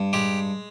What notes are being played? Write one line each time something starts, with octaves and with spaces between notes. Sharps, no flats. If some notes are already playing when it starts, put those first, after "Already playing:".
Already playing: G2
G#3 G4